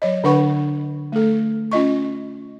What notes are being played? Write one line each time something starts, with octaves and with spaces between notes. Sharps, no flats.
F#3 C#5 D#5
D3 D4 B4 F#5 B5 C#6
A3 A4
C#4 F4 D#5 C#6